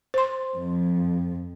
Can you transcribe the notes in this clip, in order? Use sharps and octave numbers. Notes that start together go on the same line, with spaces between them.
C5 C6
F2